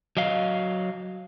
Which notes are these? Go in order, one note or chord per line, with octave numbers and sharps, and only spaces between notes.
F#3 D#5 F5